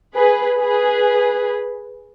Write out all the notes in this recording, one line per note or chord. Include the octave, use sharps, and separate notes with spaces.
G#4 B4
G#4 B4